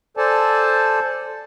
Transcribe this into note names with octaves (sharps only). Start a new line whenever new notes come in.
A4 C5 D5 G#5 A5